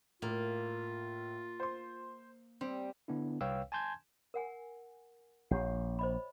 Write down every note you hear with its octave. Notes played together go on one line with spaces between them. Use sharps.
A2 A#3 F4
C5 C6
G3 C4
D3 B3 D4 E4
C2 B4 C#5 F5 G5 E6
G#5 A5 C6 G6 G#6
A#4 F#5 G#5
A#1 G4 C#5 F#5
C5 D#5 B5